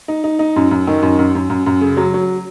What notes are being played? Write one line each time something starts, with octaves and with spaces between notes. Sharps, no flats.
D#4
D#4
D#4
F#2
F#2
D#3
F#2
F#2
F#2
F#2
F#2
C#3
F#3
F#3